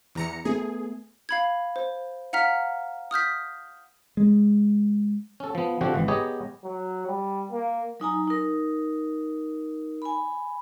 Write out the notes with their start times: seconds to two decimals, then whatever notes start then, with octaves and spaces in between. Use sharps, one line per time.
0.15 E2 A#5 C#7
0.45 A3 B3 G#4
1.29 F5 B5 G#6
1.76 C5
2.33 F5 F#5 A#5 F6 B6
3.11 D#6 F6 G6 B6
4.17 G#3
5.40 C#4 A4
5.55 F3 B3
5.81 D3 F3 C4 F#4 G4
5.94 G#1 E3
6.08 B3 G4 G#4 C#5 D#5 A#5
6.64 F#3
7.07 G3
7.51 A#3
8.00 F#3 D#4 G#5 A#5
8.27 D#4 A#4
10.02 G#5 B5